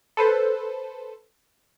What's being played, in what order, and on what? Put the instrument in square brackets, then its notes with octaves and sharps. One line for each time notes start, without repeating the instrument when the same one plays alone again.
[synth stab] A4 B4 C5